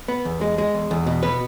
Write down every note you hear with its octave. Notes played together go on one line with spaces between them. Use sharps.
B3
E2
G#3
G#3
E2
E2
B2
B3 B4